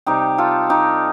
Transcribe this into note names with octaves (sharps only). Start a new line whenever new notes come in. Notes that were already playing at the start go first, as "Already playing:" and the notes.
C3 G3 D#4 G4
F4 A4
D#4 G4